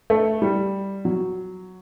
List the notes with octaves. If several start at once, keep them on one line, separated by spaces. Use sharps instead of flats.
A3
G3
F#3